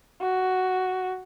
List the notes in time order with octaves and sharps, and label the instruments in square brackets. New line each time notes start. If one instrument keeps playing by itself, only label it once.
[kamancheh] F#4